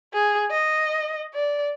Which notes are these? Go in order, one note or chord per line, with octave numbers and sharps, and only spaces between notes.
G#4
D#5
D5